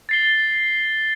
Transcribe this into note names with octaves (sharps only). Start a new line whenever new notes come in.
A6 C7 G7